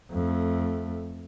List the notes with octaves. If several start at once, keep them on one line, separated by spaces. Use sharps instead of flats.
F2 A3